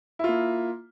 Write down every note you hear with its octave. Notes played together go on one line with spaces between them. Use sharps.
A#3 E4 F4